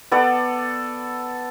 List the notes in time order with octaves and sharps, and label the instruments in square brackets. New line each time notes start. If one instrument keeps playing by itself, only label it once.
[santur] B3 A4 D5